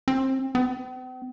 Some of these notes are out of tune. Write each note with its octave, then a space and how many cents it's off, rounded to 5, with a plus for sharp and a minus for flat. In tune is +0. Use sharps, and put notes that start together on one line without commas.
C4 +30
C4 -45